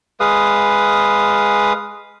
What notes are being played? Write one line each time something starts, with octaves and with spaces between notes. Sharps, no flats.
G#3 B4 F5 D#6